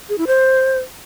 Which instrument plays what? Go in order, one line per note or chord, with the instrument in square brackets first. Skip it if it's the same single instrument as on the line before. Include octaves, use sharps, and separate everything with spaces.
[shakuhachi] G#4
E4
C5